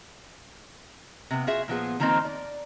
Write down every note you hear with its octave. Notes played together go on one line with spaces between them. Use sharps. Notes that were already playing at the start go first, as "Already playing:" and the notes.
C3 B3
F4 F#4 G#4 E5
A#2 F3 B3 G#4
D#3 F3 A#3 C4 D#4
D5